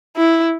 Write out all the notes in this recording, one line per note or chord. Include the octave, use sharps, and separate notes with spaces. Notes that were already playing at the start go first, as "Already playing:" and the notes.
E4